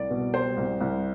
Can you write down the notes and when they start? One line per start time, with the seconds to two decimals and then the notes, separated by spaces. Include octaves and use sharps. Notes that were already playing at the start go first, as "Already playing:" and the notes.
Already playing: C2 D5
0.10 B2
0.33 G3 C5
0.57 C2
0.81 C2